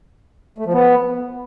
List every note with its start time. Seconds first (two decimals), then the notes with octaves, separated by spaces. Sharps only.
0.58 A3
0.66 F3
0.73 B3